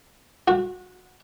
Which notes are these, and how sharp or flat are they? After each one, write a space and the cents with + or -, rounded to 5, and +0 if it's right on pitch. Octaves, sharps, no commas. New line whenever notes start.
F#4 -25